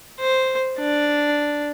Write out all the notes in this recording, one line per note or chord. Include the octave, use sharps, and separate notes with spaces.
C5
D4